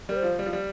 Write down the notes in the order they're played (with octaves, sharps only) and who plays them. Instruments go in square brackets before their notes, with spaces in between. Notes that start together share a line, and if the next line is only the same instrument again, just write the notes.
[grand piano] G3 [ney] A#4
[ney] C5
[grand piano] F3
G3
F3
G3